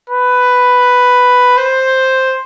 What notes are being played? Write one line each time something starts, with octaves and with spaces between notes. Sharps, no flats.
B4
C5